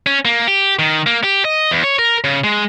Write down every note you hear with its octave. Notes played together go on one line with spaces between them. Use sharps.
C#4
A#3
G4
D#3
A#3
G4
D#5
E2
C#5
A#4
C#3
G#3